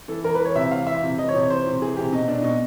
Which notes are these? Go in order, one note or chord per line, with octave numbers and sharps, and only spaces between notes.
E3 A4
E3 A#4
B4
E3
C#5
C3 E5
E3 F5
E3 E5
C3
E3 D#5
C#5
C3
C#5
E3 C5
C3
E3 G#4
C3 G4
B2 D#4
B2 D4
B2 D#4